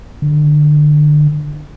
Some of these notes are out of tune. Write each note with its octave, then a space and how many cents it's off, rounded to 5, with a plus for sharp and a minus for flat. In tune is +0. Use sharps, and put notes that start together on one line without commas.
D3 +25